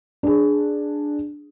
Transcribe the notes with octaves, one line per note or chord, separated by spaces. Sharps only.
D4 G#4